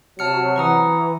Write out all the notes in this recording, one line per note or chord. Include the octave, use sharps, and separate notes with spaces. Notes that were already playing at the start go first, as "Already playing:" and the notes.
C3 F#3 A5 F6 C#7
E3 F#5 A#5 D#6